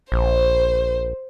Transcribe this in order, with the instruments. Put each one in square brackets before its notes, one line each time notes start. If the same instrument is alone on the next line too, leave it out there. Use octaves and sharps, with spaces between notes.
[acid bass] A#1 [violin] C5